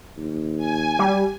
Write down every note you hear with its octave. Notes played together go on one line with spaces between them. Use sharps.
D#2
G#5
G3